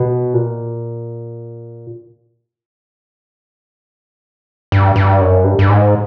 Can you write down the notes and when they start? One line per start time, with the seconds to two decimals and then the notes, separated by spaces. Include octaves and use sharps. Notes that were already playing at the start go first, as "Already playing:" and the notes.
Already playing: B2
0.34 A#2
4.72 G2
4.96 G2
5.21 F#2
5.44 G2
5.59 G2
5.69 G#2